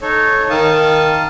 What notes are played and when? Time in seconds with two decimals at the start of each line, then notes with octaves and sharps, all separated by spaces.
0.01 D#4 A4 C#5
0.50 D#3 F5 A5 D#6